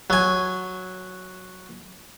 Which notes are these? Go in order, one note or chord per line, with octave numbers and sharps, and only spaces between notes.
F#3 G#5